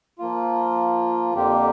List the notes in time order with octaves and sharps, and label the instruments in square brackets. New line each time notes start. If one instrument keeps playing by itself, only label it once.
[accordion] F3 A#3 F4
F2 D3 A#3 G4